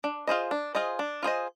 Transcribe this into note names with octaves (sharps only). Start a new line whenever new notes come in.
D4
F4 G#4 C5 D#5
D4
F4 G#4 C5 D#5
D4
F4 G#4 C5 D#5